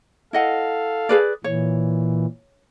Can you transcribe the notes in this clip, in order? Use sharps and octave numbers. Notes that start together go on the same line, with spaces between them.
E4 A4 D#5 F5 F#5
G#4 B4 D5
A#2 E3 C#5